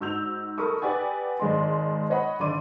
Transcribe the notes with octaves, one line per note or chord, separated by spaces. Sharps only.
G#2 F#4 E6 G6 F7
A4 A#4 B5 C#6 D#6
G4 B4 D5 F#5 G#5
G#1 G#3 D5 C6
C#5 D#5 F#5 B5
G#1 D3 D5 C6 D6 D#7